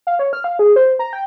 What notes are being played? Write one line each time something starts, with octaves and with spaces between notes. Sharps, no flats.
F5
C#5
F6
F5
G#4
C5
A#5
G5